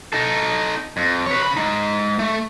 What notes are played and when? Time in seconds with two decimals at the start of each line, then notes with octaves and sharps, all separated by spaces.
0.13 D#4 A4
0.97 F2
1.26 B4 C#5
1.43 C#3 B5
1.57 G#3 D#4
2.19 A3